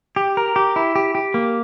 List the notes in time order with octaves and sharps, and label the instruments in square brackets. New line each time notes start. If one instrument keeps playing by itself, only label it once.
[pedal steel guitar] G4
A#4
G4
E4
G4
G4
A#3